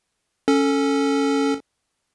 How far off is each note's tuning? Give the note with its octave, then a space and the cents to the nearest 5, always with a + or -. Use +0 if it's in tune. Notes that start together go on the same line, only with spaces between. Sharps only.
C#4 +0 A4 +5